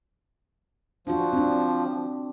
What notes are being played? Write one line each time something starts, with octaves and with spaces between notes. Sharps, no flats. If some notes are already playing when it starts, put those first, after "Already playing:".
F3 D4 F#4
C4 D4